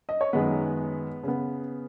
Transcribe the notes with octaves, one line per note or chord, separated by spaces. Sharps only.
D#5
C#5
F#2 D#3 G#3 B3 B4
C#3 B3